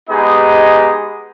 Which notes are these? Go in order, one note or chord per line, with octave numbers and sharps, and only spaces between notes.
G#3 B3 D#4 G4 G#4 D#5